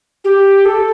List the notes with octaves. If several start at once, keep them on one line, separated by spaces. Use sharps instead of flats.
G4
A4